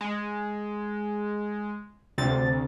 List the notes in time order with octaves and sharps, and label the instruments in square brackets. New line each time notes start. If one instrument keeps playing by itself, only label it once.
[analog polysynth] G#3
[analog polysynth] D2 [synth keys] C3 A6